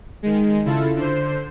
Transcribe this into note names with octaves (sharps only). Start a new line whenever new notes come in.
D#3 G#3
C#3 E4 F4 A4
D3 C5